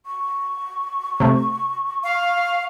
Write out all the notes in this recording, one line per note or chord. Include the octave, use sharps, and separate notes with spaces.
C#6
C3 A3
F5